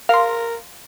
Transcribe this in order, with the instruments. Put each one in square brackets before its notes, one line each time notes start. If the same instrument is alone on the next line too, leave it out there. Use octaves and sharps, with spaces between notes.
[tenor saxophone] A#4 [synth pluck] F5 C6